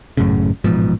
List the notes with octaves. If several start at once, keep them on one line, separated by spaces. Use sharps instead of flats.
G#1 F#2 A2 C#3
A1 G#2 B2 F3